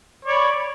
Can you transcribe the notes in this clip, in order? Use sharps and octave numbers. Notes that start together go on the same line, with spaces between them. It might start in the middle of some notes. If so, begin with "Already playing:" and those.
C#5 D5 B5